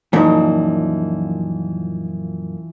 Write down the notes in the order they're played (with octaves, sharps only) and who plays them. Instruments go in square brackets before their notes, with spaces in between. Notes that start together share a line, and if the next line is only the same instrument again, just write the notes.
[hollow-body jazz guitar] F#2 A#2 [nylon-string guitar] E3 F3 [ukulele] D#4 C5 A5